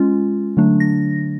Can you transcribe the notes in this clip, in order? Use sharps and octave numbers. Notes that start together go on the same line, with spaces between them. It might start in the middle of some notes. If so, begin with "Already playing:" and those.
Already playing: G#3 C#4 F4
D3 F#3 A3 D4
A#6